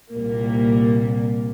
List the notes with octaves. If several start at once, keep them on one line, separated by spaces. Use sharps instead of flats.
C2 A#2 G3 A#3